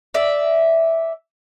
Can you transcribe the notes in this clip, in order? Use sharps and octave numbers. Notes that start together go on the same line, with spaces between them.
D5 E5